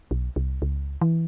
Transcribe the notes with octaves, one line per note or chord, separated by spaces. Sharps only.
B1
C2
C#2
E3